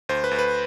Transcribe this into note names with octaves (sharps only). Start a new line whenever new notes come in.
D2 C5
B4
D2
B4